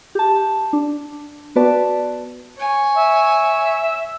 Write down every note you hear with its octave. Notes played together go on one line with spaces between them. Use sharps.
G4 A5
D4
B3 F#4 B4 D5 A5
C#5 G#5
E5